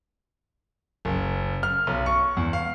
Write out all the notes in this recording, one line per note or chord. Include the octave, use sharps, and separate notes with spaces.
F#1
F6
B1
C#6
E2
F5